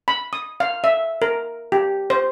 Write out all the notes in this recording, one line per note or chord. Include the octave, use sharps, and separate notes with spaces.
B5
D#6
F5
E5
A#4
G4
C5